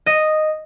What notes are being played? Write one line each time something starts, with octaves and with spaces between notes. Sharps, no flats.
D#5